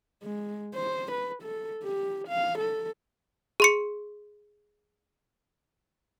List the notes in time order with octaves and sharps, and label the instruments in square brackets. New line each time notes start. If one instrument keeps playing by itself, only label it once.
[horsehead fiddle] G#3
C5
B4
A4
G4
F5
A4
[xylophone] G#4 C6 C#7